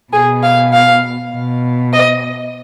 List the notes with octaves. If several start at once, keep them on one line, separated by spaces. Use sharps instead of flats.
B2 G#4
F5
F5
B2
D#5